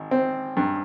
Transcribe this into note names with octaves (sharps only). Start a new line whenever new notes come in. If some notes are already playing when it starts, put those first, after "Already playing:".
Already playing: G#1
C4
G2